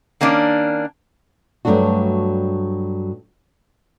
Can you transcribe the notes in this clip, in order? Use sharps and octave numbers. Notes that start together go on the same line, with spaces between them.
D#3 A#3 C#4 D4
G2 F#3 A3 D4 F#4